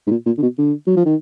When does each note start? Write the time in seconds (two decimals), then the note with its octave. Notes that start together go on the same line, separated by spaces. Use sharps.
0.07 G#2
0.11 A#2
0.26 A#2
0.38 D3
0.42 B2
0.58 D3
0.87 F#3
0.96 F3
1.05 D#3